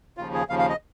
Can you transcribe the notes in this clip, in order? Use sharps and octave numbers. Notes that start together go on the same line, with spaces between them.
D#2 C#3 F3 F4
G#4
D#2 C#3 F3 F5
F5
D#5